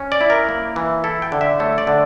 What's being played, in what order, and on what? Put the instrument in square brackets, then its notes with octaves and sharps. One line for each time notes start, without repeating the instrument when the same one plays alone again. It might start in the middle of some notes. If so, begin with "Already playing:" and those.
Already playing: [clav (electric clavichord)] C#4
D5
E4
A#4
A#3
E3
E4 A4
G5
D3
E5
A3 C#5
D5
D3